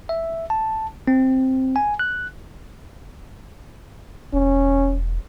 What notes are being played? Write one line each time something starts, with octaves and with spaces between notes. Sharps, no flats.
E5
A5
C4
G#5
F#6
E1 C#4